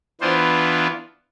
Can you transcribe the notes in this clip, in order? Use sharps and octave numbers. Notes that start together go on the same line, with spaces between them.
E3 B3 D4 F4 C5